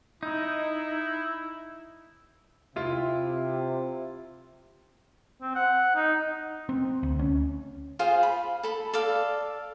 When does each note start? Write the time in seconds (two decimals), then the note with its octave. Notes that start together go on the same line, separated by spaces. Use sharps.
0.23 D#4 E4
2.76 C3 E4 F4
5.41 C4
5.55 F#5
5.95 D#4
6.69 C4
7.03 D2
7.19 C#4
7.99 F4 G#4 C5 F5
8.23 B5
8.63 A4 B5
8.93 A4 D5 F5